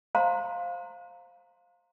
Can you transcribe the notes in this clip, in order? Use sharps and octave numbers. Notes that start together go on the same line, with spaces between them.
C5 F5 A#5 C6